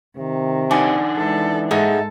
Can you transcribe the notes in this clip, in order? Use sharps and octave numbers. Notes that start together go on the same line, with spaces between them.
C3 D#3
D4 D#4 D5 F#5 G#5 C6
E3 G#3 A4
G#2 D#4 G#4 A4 E5 F#5